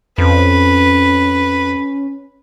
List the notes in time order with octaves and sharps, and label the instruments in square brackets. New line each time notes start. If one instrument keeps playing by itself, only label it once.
[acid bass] F2 [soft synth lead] C#4 [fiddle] B4